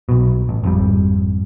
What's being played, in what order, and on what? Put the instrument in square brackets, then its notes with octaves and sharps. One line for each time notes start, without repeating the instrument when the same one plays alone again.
[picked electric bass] B1 B2
A1
G#1 F2 G3